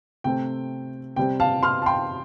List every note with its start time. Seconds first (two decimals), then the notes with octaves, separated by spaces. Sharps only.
0.24 C3 A3 C4 G5
1.16 C3 G3 C4 G5
1.40 F5 A5
1.63 C6 F6
1.82 A5
1.86 G5 C6